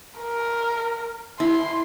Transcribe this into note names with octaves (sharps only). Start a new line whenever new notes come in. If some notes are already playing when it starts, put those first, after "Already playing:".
A#4
E4 C6